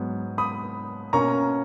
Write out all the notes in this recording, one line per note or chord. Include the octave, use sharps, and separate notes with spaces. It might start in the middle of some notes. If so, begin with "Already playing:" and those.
Already playing: G#2 F#3 B3
B5 D#6
B2 A#3 C#4 A#5 C#6